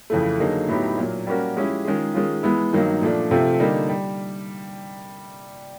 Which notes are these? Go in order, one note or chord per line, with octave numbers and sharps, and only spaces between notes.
F2 C#3 E3 A3
D3 F#3 A#3 D#4 G#4
A2 F#3 B3 D#4 G4
A#2 F#3 A#3
G3 A#3 C#4 F#4 A#4
F3 G#3 C#4 E4 G4
D#3 G#3 C#4 F4 G#4
D#3 G#3 C#4 F4
E3 G#3 B3 E4
G2 D#3 F#3 A#3 D#4
A#2 F3 A3 D4
C3 F3 A3 C4 F4
D3 G3 A#3 D#4
G3